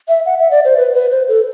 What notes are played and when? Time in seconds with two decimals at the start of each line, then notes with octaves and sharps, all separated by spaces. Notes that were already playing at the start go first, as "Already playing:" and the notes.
0.08 E5
0.26 F#5
0.39 E5
0.51 D5
0.65 C5
0.77 B4
0.94 B4
1.11 C5
1.28 A4